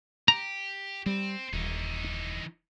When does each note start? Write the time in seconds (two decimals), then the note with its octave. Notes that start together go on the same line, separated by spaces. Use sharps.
0.28 G4 A#5
1.06 G3 C4
1.53 D#1 E3 D#4